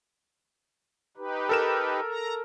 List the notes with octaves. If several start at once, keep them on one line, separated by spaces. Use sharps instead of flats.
D#4 G4 B4
A4 A#4 E7
A#5